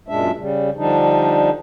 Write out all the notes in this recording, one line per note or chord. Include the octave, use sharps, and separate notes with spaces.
F#2 A#2 G#3 D4 E5
C#3 G3
D3 F3 G3 D4 D#4